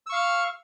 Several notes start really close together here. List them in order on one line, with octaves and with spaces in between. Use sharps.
E6 C#6 F5 F6